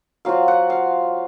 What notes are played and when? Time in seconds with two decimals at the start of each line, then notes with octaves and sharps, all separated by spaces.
0.25 F#3 C4 F4 F5
0.48 F#5
0.70 F5